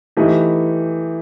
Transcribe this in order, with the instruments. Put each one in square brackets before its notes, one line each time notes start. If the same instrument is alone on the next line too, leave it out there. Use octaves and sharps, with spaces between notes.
[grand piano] E3 A3 D#4 G4 B4